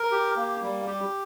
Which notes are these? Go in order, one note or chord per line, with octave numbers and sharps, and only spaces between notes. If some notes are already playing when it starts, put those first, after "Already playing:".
Already playing: A#4
G4
A#3
G3
G4